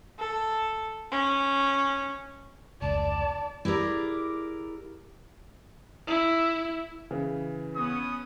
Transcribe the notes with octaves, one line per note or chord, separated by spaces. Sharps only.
A4
C#4
F1 C#2 D5 A5
E4 G4 G#4 A#4 D5
E4
C#3 E3
B3 C#4 D#6